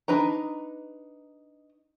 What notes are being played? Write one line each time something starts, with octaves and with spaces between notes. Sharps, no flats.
D4 D#4 B4 A#5